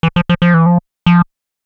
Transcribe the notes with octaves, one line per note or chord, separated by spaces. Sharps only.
E3
F3
F3
F3
E3
F3
F3